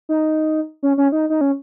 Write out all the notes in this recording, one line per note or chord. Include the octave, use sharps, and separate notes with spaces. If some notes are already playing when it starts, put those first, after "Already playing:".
D#4
C#4
C#4
D#4
D#4
C#4